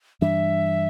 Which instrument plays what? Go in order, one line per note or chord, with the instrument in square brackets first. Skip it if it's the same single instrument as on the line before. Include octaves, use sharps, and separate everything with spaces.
[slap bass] G2 E3 G3 D4 [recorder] E5